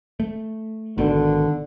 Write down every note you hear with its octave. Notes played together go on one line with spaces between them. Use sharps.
A3
G#1 B2 D3 D#3